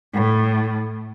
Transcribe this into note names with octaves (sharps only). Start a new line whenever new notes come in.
A2